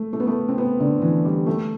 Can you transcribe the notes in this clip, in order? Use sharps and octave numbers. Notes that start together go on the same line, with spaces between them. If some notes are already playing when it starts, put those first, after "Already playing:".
Already playing: A3
A3
B3
A3
C4
B3
D3
E3
G3
A3